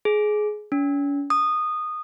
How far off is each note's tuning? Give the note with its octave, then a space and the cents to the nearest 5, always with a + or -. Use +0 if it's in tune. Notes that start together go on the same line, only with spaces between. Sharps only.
G#4 +20
C#4 +40
D#6 -15